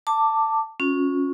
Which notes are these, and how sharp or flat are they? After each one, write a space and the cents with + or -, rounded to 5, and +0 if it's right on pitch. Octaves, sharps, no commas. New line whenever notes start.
A5 +15 D6 +0
C#4 -5 F4 +45